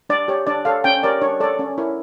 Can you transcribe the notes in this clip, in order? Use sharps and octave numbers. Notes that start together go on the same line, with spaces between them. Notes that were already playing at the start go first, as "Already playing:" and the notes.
D4 D5
G4 C#5
D4 D5
A4 C#5 F5
C#4 G5
G4 A#4 C#5 D5
D4 C#5
A4 C#5 D5
C#4
E4 A#4 C#5